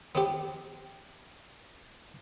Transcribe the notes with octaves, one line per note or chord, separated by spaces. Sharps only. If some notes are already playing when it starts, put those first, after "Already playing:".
B3 C4 G4